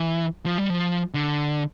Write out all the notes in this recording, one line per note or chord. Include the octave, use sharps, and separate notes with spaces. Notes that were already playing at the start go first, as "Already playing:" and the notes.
Already playing: E3
F3
G3
F3
D3